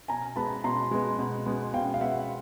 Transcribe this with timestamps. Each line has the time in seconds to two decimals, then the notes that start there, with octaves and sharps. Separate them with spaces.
0.08 B2 G#5 A#5
0.36 G#3 B3 A5 B5
0.64 B2 A#5 C6
0.91 G#3 B3
1.19 B2
1.46 G#3 B3
1.74 B2 F5 G5
1.94 F5
2.01 G#3 B3 E5 F#5